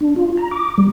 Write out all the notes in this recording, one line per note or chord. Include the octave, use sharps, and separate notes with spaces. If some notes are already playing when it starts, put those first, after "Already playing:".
D4
F4
A#5
D6
G3